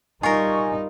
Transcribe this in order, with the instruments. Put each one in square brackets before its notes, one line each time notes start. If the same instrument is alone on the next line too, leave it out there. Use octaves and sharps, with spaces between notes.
[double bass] G3 D#4 [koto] F4 A#4 [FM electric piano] G#5 C#6